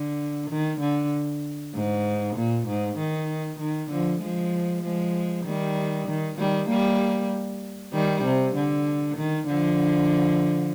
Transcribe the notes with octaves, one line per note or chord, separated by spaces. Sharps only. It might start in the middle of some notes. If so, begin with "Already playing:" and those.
Already playing: D3
D#3
D3
G#2
A#2
G#2
D#3
D#3
D3 F3
F3 G#3
F3 G#3
D#3 G3
D#3
D#3 G3
G3 A#3
D#3 G3
C3
D3
D#3
D3 F3